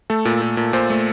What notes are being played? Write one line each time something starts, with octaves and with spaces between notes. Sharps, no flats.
A3 A4
A#2
A#2
A#2
A#2 C5
A3